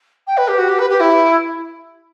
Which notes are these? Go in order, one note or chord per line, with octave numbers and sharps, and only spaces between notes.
G5
B4
G4
F#4
G4
B4
G4
E4